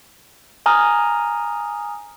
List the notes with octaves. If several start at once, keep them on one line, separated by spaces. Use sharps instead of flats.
G#5 A#5 D#6 F6